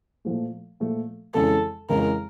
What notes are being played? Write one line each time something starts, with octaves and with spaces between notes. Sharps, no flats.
A#2 F3 A3
A#2 F3 A3
F2 C#3 E3 G#3 C#4 A4
F2 C#3 E3 G#3 C#4 A#4